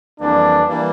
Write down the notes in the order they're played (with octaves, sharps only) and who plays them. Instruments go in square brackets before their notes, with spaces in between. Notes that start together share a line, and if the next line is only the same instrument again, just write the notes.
[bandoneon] F2 E3 G3 A#3 [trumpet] D4
[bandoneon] E3 G3 A#3